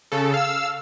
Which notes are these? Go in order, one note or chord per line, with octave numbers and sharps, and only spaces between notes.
C#3 A4
F5 E6